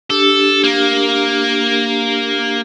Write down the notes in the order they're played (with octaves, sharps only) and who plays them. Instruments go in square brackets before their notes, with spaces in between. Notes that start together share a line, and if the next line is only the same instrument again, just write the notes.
[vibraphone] D4 G4 [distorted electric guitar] A4
[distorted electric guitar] A#3